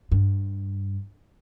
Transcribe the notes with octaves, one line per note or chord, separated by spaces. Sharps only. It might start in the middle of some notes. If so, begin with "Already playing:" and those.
G2